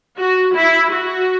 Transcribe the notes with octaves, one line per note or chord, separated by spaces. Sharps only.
F#4
E4
F#4